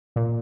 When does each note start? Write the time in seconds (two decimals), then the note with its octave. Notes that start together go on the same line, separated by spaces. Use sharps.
0.16 A#2